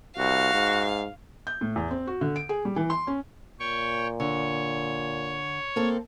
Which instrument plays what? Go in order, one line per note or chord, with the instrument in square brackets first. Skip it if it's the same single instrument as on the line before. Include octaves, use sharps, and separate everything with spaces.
[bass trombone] C2 [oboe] F#4 [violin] F5
[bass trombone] G#2
[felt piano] G6
A2
E2
C4
F#4
D3
D7
G#4
G3
E3
C6
C#4
[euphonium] A#2 [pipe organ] C#5 G5 C#6
[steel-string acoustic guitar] D3 [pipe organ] C#5
[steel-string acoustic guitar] A#3 C4 A4